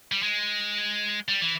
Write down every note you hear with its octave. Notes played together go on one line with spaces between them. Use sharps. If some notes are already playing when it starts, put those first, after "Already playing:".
G3
G#3
G3
E3